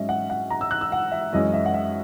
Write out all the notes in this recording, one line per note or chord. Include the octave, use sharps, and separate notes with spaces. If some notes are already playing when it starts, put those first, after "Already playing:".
Already playing: G#2 F#3 C#4 D#5 E5
F#5
F#5
A#5
E6
F#6
E6
F#5
E5
F#2 E3 G#3 C#4 D#5
E5
F#5
E5